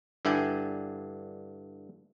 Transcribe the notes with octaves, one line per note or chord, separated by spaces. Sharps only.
G2 D3 E4 D5 G5 G#5